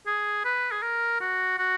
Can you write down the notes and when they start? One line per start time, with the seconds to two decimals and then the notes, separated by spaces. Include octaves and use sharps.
0.06 G#4
0.45 B4
0.72 G#4
0.82 A#4
1.21 F#4
1.58 F#4